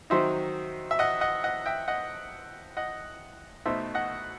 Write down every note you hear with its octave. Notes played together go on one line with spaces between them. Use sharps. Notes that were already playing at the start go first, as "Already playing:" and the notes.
D#3 F#3 C4 D#4 C5 E5
E5
D#5 F#5
D#5 F#5
D#5 F#5
E5 G5
D#5 F#5
D#5 F#5
B2 A3 D#4 C5 E5
D#5 F#5